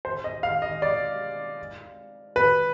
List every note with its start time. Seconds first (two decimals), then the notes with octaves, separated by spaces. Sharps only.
0.05 C5
0.24 D#5
0.43 F5
0.62 D#5
0.82 D5
2.36 B4